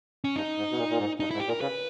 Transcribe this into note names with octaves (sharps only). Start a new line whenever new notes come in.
C#4
G2 D#4
G#2
B2
A#2
A#2
G#2
G2 D#4
G#2 E4
G4
A#2
A#4
C#3 B4